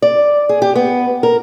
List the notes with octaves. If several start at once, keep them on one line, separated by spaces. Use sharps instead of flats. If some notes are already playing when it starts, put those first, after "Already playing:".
D5
G#4
G4
B3
A#4